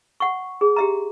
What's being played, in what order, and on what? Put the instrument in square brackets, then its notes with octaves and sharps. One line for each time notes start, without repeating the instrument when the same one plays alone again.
[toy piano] F#5 C#6
G#4
G4 E5 A#5